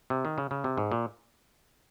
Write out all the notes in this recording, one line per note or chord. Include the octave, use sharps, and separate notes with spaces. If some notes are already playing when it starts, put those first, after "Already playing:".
C3
D#3
C#3
C#3
C3
G#2
A#2